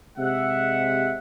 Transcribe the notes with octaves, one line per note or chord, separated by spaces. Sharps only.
C3 G#3 E5 F#5